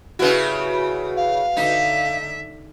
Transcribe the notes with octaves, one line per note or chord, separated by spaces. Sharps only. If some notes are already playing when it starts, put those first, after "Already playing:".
C#3 G3 E4 F#4 B4
F5
D3 D#4 E5